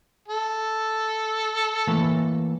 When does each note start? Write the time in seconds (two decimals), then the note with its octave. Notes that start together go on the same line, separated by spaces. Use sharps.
0.28 A4
1.87 E3 A3 A#3